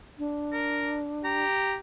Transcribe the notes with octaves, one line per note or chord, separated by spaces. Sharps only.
D4
A#4
G4 A#5